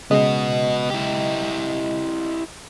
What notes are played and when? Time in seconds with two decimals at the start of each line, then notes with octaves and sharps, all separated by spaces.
0.11 C#3 G#3 B3 F#4 D#5
0.90 E4 G4